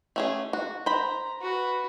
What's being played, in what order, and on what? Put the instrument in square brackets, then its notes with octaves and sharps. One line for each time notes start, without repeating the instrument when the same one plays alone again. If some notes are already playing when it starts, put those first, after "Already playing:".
[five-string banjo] A3 C#4 G#4
F#4
[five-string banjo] C5 B5 [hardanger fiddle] A#5
[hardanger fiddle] F#4 B4